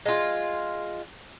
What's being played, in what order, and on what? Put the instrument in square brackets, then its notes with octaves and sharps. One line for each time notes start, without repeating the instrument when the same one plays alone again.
[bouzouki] G#3 F4